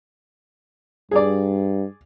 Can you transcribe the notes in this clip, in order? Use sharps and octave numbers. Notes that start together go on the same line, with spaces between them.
G2 G#4 D5